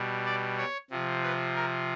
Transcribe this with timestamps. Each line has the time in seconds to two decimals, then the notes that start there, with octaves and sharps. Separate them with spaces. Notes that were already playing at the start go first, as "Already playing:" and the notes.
Already playing: B2 G3
0.26 D5
0.58 C#5
0.91 C3 F3
1.23 B4
1.55 A#4